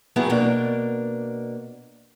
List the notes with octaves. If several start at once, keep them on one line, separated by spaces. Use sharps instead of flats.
E3 F#3 B3 E4 G4 G#4
B2 A#3 D4